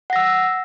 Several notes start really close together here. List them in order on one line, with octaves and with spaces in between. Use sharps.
F#5 A#6 E6